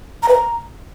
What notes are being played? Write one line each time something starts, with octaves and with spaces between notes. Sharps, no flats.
A#5
B4
A#5